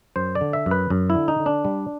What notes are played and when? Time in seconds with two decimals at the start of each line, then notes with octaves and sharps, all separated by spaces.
0.16 F#2 C5
0.35 D5
0.41 D3
0.53 E5
0.66 F#2
0.71 B4
0.90 F#2
1.10 E4
1.15 D3
1.28 D#4
1.39 D3
1.46 D4
1.65 G3